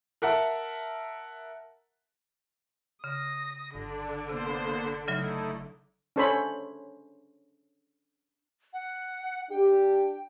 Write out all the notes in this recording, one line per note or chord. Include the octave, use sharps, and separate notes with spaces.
A#4 E5 F#5 A5 A#5
C#3 D#6 A#6
G1 D3 D4
C3 A#3 B3 C5
C#3 F#3 A3 D#4 E4 E5
C#4 D4 A4 C5 C#5 B5
F#5
D4 G4 G5